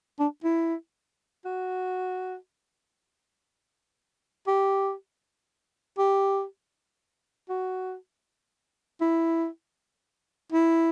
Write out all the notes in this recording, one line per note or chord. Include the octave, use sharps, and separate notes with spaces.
D4
E4
F#4
G4
G4
F#4
E4
E4